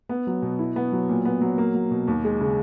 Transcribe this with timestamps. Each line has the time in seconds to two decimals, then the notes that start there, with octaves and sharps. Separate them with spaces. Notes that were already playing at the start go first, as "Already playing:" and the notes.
0.09 B3
0.27 F#3
0.42 B2
0.59 E4
0.76 B3
0.92 F#3
1.09 A#2
1.25 B3
1.41 F#3
1.58 A#3
1.75 F#3
1.91 B2
2.08 D#2
2.24 G#3
2.41 C#3